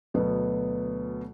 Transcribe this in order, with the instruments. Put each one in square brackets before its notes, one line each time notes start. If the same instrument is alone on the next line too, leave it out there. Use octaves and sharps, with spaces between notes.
[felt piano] D2 B2 F#3 B3